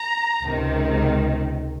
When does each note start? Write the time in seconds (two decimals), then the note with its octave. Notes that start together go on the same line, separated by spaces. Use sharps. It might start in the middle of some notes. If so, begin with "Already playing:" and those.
Already playing: A#5
0.43 C#2 C3 D#3